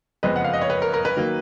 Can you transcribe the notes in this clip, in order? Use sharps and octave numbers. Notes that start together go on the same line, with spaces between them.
F#1 F2 F3 G#3 B3 B4 D#5
F#5
F5
D#5
C#5
B4
A#4
A#4
B4
D#3 F#3 A#3